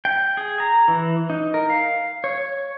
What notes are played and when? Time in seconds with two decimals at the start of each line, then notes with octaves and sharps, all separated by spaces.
0.05 G5
0.37 G#4
0.60 A#5
0.88 E3
1.30 D#4
1.54 A#4
1.70 F5
2.24 C#5